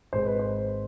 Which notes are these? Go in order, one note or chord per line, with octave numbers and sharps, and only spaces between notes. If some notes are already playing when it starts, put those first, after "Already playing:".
G#1 G#2 G#3 C5
B4
C5